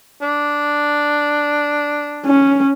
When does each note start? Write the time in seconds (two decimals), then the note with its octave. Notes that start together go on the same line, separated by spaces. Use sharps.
0.22 D4
2.26 C#4